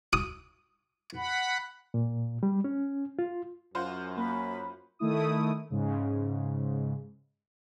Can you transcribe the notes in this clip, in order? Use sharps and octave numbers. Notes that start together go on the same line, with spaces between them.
D#6
F#5 B5
A#2
G3
C#4
F4
F#2 F4 F#4 C5
A#3 B5
D#3 A3 E4 D#6
G#2 C#3